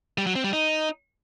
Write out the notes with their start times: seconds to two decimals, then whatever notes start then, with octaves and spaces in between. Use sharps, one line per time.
0.18 G3
0.27 F#3
0.35 C4
0.44 G3
0.53 D#4